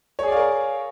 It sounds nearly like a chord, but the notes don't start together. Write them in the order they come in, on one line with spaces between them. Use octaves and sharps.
C#5 G#4 D5 F5 A#4